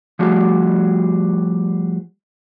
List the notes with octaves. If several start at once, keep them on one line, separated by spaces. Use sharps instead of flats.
F3 G3 A3 F#4 G#4